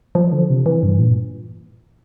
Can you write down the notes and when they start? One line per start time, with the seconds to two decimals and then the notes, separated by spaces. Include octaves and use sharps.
0.15 F3
0.32 D3
0.50 C3
0.66 E3
0.83 G2
0.99 A#2